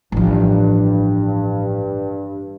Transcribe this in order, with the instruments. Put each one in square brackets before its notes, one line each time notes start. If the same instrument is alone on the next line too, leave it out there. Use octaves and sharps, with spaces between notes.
[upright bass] A1 F3 [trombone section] G2